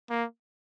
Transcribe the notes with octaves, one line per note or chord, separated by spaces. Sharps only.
A#3